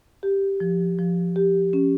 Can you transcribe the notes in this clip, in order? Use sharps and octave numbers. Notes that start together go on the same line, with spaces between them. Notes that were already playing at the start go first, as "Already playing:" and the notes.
G4
F3
F3
G4
C#4